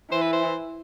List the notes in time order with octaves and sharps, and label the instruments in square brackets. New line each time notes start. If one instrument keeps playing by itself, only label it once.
[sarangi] E3 [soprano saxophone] C5
[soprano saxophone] B4
C5